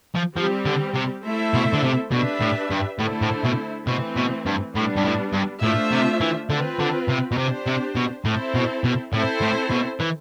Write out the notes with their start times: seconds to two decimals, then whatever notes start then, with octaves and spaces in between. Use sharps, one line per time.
0.15 F3
0.36 F3 G3 C4 G4
0.66 D3
0.95 C3
1.24 A3 E4 A4 C5 E5
1.54 B2
1.73 D3
1.83 C3
2.12 B2 D4 G4 B4 E5
2.41 A2
2.71 G2
2.99 A2 D3 A3 E4 A4 C5
3.22 A2
3.44 B2
3.87 B2 E3 A3 C4
4.16 B2
4.46 G2
4.75 A2 G3 B3 D4
4.96 G2
5.04 A2
5.33 G2
5.62 A2 A3 D4 F4 C5 E5
5.92 C3
6.21 E3
6.50 D3 C4 F4 B4
6.79 D3
7.08 C3
7.31 B2
7.38 C3 D4 G4 C5
7.67 C3
7.96 B2
8.25 A2 C4 E4 A4 C5
8.55 B2
8.84 B2
9.13 A2 C4 E4 A4 C5
9.42 A2
9.71 B2
10.00 E3